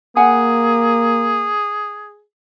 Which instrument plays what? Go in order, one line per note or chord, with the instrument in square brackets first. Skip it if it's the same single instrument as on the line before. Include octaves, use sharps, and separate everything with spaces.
[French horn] A#3 [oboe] G#4 [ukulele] F#5 G#5